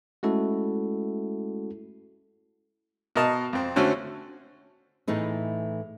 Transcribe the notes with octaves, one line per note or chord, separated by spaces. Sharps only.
G#3 A3 C#4 E4 F#4 A4
B2 A#4 D#5 A5
F2 C4
D3 A3 C#4 F#4 C5
A2 E3 A3 D#4 G#4